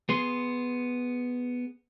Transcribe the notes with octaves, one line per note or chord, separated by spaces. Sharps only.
B3 G#4 C6